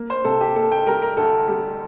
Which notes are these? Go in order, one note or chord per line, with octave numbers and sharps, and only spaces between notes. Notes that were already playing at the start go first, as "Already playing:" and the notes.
Already playing: A#3
C5
C3 A4
G4
A#3 A4
G5
G3 A#4
A#4
D2 A4
G3